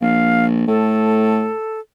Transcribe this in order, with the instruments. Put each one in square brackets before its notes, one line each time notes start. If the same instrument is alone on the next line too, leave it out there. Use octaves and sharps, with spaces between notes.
[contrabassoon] A#1 [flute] F5
[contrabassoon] A2 [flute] A4